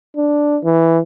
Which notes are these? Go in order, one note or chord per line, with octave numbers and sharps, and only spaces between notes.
D4
E3